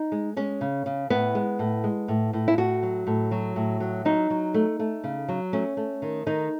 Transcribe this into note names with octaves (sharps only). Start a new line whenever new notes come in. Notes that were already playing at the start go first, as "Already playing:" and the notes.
Already playing: D#4
G#3
G#3 C#4
C#3
C#3
A2 B3
G#3
A2
G#3
A2
A2
E4
A2 F#4
F#3
A2
F#3
A2
F#3
F#3 D#4
F#3
A3
A3
C#3
F#3
A3 C#4
A3
D#3
D#3 D#4